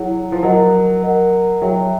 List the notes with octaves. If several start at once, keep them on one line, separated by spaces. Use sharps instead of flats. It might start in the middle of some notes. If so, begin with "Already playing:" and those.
Already playing: F#3 E4 G#4 C#5 F#5
F3
F#3 A#4 D#5 F#5
A#4 D#5 F#5
F#3 G#4 C#5 E5 G5